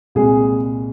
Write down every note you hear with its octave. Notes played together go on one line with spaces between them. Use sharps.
C2 A#2 G#3 G#4